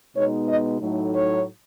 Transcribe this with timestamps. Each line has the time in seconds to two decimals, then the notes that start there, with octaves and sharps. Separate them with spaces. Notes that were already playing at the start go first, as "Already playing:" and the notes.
0.15 B2 G#3 B3 D#4 C#5
0.48 D#5
0.79 A2 F#3 A3 D#4
1.12 C#5